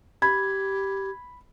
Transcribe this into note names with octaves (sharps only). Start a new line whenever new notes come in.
G4 B5 G#6